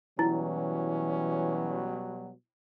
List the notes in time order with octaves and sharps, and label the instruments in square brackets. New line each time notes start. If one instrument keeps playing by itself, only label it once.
[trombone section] B2 F#3 G3 [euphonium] E3 [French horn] C#4 [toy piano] E4